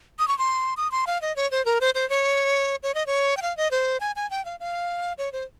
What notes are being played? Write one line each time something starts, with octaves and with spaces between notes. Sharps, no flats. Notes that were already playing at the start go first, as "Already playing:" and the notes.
D#6
C#6
C6
D#6
C6
F5
D#5
C#5
C5
A#4
C5
C5
C#5
C#5
D#5
C#5
G5
F5
D#5
C5
G#5
G#5
G5
F5
F5
C#5
C5